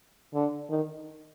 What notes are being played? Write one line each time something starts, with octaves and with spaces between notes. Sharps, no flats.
D3
D#3